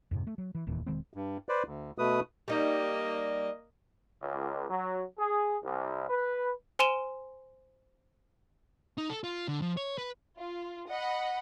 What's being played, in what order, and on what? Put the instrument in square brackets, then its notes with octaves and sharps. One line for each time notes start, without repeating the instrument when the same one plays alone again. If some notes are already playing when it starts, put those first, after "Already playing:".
[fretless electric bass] F2 G#2 C3
A3
F#3
E3
F1 D#2 A#2 E3
E1 D#3 G#3 C4
[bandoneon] G2
B4 C5 D5
D2
B2 A3 B4 D#6
[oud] G3 D#4 [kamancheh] A#3 D#5
[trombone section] C#2
F#3
G#4
C2
B4
[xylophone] C5 G#5 C6 D#7 E7 G7
[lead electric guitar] D#4
A4
F4
D3
F3
C#5
B4
[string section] F4
D#5 F#5 B5